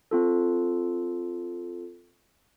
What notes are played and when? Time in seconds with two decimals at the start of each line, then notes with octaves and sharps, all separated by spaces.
0.11 C4 F4 A4